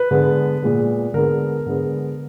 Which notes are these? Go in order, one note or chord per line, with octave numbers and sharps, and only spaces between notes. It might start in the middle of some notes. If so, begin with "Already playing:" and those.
Already playing: B4
D3 G#3 B3
A#2 G#3 B3
D3 G#3 B3 A#4
D3 G#3 B3